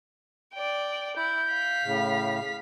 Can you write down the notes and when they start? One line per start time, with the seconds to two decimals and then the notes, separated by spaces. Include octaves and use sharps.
0.54 D5 G5
1.16 E4 G6
1.50 F5 B6
1.84 A2 C#3